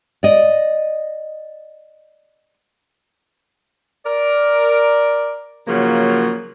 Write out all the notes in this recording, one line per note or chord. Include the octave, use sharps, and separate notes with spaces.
D5 D#5
A#4 D5
C#3 F3 F#3 A#3